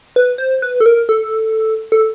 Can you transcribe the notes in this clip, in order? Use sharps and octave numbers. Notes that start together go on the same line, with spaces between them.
B4
C5
B4
A4
A#4
A4
A4